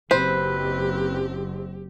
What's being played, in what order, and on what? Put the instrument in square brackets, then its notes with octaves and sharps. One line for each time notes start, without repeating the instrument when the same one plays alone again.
[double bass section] F#1 F#3 C4 [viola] G4 [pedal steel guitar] B4 [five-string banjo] C5